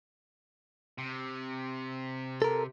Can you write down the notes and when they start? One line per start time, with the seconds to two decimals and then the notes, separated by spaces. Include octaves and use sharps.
0.98 C3
2.42 A4 A#4